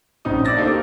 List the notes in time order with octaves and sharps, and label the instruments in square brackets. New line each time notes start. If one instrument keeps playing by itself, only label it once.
[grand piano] A#1 C#3 C4 D#4 D#6
D5 D6 E6 A6 A#6
A#3 D4 D#4 G4 A4 C5
A#4 D6